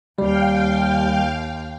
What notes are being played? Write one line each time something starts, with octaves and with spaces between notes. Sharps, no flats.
D#2 G3 F5 G5